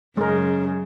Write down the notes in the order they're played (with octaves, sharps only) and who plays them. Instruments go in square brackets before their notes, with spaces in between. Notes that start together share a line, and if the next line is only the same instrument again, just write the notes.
[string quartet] F#2 C#3 [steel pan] G#3 A#4